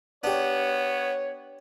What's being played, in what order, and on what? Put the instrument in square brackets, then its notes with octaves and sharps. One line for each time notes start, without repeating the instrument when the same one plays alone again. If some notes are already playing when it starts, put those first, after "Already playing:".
[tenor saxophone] B3 [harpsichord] D4 G4 [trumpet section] C#5